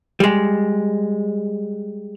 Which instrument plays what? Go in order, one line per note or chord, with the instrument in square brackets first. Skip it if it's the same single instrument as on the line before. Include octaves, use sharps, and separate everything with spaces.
[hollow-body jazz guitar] G3 G#3